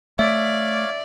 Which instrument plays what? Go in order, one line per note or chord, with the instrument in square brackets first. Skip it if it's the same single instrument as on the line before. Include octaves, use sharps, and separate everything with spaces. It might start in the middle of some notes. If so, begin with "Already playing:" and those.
[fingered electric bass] A3 [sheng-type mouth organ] C#5 F5 D6 [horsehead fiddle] D5 [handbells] E5